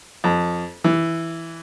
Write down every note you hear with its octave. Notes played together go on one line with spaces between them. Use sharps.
F2
E3